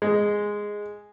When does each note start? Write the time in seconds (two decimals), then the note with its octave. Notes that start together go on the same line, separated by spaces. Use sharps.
0.02 G#3